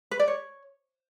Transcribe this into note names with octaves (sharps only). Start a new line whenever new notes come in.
B4
D5
C#5